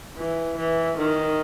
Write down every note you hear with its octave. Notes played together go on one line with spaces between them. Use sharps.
E3
E3
D#3